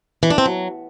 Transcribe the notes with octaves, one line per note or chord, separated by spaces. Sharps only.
E3
D4
C4
F#3